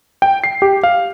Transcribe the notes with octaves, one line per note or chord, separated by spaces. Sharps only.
G5
C7
G4
F5